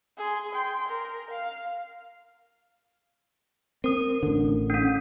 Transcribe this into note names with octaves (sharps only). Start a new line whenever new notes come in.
G#4 C6
G5 C6
A#4
F5
C4 A#4 D#6
A1 D3
C#4 D4